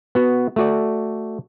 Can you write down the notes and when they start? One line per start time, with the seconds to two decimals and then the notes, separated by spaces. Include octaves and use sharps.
0.15 B3 F#4
0.56 A3 F#4 D5